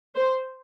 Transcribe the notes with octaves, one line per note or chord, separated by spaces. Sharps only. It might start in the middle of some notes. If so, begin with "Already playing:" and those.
C5